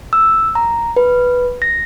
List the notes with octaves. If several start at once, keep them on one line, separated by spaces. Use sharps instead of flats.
E6
A#5
B4
A#6